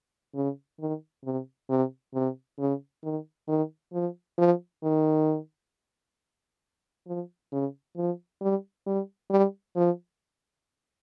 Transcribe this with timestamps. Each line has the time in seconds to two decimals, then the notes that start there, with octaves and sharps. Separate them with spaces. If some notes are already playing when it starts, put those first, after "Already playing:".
0.35 C#3
0.80 D#3
1.25 C3
1.69 C3
2.14 C3
2.59 C#3
3.03 D#3
3.48 D#3
3.93 F3
4.38 F3
4.83 D#3
7.07 F3
7.52 C#3
7.97 F3
8.41 G3
8.86 G3
9.31 G3
9.76 F3